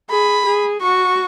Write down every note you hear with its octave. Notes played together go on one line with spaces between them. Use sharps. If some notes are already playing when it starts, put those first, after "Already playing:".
G#4 B5
G#4
F#4 C#6